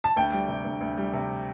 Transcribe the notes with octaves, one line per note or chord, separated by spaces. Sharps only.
A5
D2 G5
G3
C3
D2
D2
G3
C3